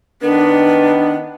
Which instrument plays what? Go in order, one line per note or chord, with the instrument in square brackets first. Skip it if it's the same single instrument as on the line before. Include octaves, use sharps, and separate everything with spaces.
[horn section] D#3 B3 [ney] D4